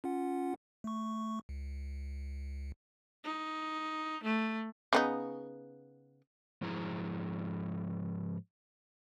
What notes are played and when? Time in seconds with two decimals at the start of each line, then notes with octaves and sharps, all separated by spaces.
0.04 C#4 F4 F#5
0.84 A3 C#6
1.49 C#2
3.24 D#4
4.23 A3
4.93 C#3 B3 D#4
6.61 G#2 F3 E4 G#4 A#5